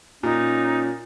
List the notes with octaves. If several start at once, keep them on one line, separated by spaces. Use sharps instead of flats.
A#2 C#4 D#4